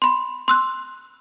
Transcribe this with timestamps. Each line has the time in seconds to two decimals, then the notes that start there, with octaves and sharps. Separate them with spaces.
0.02 B5 C6
0.48 C6 E6 F#6